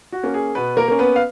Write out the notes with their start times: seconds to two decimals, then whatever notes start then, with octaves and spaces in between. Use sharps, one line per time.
0.12 F#4
0.23 A#3 C#4
0.34 G#4
0.55 B2 B3 B4
0.77 A#3 A#4
0.88 A#3 C#4
0.99 B3 B4
1.16 F5